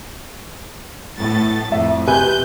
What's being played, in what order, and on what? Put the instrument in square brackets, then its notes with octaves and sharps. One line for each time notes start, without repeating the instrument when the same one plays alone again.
[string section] A2 B3 A6
[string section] F2 A2 [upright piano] E5
[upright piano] C3 B4 G#5 [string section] G6